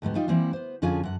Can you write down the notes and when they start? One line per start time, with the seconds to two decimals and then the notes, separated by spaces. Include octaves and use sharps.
0.02 D2 G#2 G3 B3
0.15 G3 D#4 F4
0.28 E3 G3 A#3 C4 E4
0.53 B3 C5
0.82 F2 D3 C#4 F4 G#4 G#5
1.03 F#2 F#5